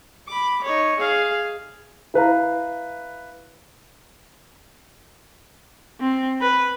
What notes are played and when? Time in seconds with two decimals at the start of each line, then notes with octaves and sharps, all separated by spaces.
0.28 B5 D6
0.64 D#4 C#5
0.99 G#4 F5
2.14 E4 B4 F5 A#5
6.00 C4
6.41 B4